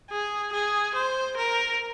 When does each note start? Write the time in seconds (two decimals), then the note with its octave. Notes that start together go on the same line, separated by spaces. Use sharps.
0.10 G#4
0.53 G#4
0.95 C5
1.37 A#4